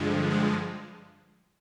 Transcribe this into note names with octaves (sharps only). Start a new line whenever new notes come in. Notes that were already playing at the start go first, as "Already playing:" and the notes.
Already playing: G2 D3 F3 G#3
G#3